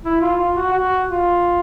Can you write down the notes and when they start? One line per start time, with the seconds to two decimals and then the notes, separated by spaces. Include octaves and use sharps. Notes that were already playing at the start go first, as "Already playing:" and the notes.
0.04 E4
0.21 F4
0.38 F4
0.56 F#4
0.73 F#4
1.08 F4